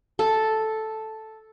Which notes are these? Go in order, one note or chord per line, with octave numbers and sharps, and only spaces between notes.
A4